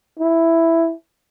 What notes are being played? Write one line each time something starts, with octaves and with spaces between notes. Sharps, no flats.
E4